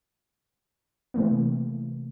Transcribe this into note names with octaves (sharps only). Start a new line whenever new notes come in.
C3 E3 A3 A#3